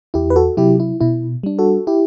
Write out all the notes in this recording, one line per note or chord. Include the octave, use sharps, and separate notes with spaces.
E2 E4 G4
B4
F#4 A4
C3 F#3 E4 G4
E4
B2 E4
G3 D4
F#4 A4
E4 G4